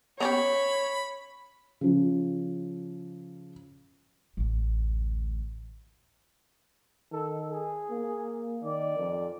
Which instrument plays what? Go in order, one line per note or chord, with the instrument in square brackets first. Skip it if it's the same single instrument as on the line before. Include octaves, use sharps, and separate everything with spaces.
[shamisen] B3 C#4 G4 [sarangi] C#5 [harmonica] B5
[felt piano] C#3 F3
[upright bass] A1 D2
[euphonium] D#3 [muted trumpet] A4
[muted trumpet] G#4
[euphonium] A#3
[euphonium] D#3 [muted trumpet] D5
[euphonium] F2